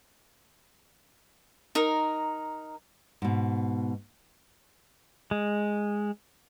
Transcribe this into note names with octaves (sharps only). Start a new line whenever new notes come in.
D#4 A#4
G#2 B2
G#3